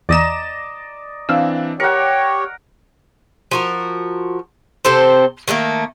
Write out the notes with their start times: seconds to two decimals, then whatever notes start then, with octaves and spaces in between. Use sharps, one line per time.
0.09 E2 D5 D#5 A#5 E7
1.29 E3 C4 D4 F5 E6
1.80 G4 A#4 C#5 F#5 C#7
3.51 F3 F#4 A#4
4.85 C3 C4 A4 C5
5.48 D#3 F#3 A3 A#3